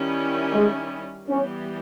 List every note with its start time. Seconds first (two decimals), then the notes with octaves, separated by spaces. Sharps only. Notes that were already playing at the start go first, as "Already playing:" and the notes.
Already playing: D#3 G3 C#4 E4
0.53 G#3
1.29 E3 G3 B3 C#4 G4